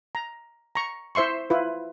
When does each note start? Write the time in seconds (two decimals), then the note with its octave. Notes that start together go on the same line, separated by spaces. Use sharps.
0.15 A#5
0.75 A#5 C#6
1.15 E4 C5 E5 C6 C#6
1.50 E4 F4 B4